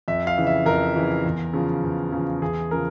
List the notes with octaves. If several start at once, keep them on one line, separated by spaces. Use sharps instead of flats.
F2 E5
F5
C#3 E3
E5
F2 A#4
C#3 E3
E2
C#3 F3
E2
C#3 F3
E2 G#4
C#3 F3 A#4